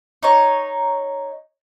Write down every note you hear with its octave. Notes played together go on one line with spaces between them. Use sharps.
D#4 C#5